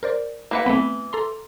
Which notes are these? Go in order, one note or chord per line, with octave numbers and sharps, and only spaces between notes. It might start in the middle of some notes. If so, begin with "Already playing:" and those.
A#4 C5 D5
A#3 B4 F#5
E3 A3 B3 C4 B5
A4 A#5 C6